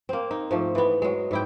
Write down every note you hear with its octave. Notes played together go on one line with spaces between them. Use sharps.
A#3 C4
D#4
G#2 F3 A3
E3 B3
F#3 G#3
G#2 E4 G5